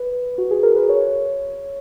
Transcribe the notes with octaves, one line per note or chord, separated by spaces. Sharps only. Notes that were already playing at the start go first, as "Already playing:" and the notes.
Already playing: B4
F#4
G#4
A#4
B4
C#5